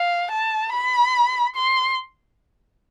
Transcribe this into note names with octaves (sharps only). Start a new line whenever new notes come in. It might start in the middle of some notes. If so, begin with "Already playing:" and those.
Already playing: F5
A5
B5
C6